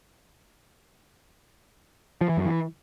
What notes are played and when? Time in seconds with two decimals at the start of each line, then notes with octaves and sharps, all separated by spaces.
2.21 F3
2.29 E3
2.37 F#2
2.45 E3